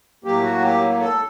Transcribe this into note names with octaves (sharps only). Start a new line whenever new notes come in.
A2 F#3 A#3 G4
F#4
G4
A4